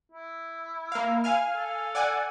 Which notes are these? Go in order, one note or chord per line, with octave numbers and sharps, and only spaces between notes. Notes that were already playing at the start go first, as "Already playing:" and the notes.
E4
A#3 F5
F5 G#5 F6
A4
D5 F#5 G#5